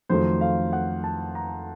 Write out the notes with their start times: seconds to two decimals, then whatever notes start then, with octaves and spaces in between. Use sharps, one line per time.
0.09 F2 D#3 F#3 A3 C5
0.41 F5
0.73 F#5
1.04 A5
1.35 A#5